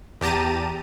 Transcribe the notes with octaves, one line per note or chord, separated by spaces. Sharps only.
E2 G4 A5 A#5 D#7